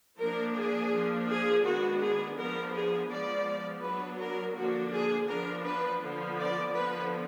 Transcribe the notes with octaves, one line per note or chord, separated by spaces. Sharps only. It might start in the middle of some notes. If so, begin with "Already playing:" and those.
F3 A#3 D4 A#4
G#4
F3 A#3 D4
G#4
D#3 G#3 B3 D4 F#4
G#4
F3 B3 D4 A#4
G#4
F3 G#3 B3 D5
F#3 B3 D4 B4
A#4
D3 F3 A#3 D4 F#4
G#4
F3 B3 D4 A#4
B4
D3 F3 B3
D5
D3 F3 B3 B4